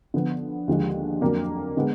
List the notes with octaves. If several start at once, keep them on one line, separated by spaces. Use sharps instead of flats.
D3 F3 B3
D#2 D3 F3 G#3
F2 D3 F#3 A#3 D4
D3 G#3 B3